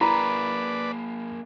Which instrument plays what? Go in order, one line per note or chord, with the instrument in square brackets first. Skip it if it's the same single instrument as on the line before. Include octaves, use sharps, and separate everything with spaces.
[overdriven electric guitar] A#3 G#4 [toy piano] E4 A#5 [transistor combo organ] B4 D5 [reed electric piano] B5